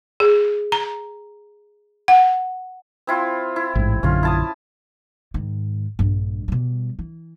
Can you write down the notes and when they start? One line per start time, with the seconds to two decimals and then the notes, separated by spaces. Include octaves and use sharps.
0.20 G#4
0.72 A#5
2.08 F#5
3.07 C4 E4 F4
3.56 E4
3.75 A1 G#2
4.03 A#1 F#2 D3 C#4 F4
4.23 E4 A5 D#6
5.34 G#2 D#3
5.99 A#1 G2
6.48 B2 G3
6.99 E3